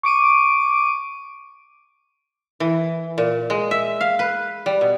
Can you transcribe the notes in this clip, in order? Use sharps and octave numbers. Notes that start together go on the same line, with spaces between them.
C#6 D6 D7 D#7
E3
A#2
G#3
E5
F5
B4
G3
B2